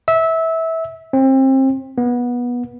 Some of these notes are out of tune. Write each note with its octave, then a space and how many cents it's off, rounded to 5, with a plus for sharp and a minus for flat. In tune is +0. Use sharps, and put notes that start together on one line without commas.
E5 -20
C4 +30
B3 -20